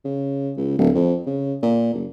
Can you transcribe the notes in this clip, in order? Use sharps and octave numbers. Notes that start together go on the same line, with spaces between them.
C#3
C#2
D1
F2
C#3
A#2
F#1